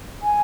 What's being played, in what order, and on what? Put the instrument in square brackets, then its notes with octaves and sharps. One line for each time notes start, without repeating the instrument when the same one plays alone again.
[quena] G#5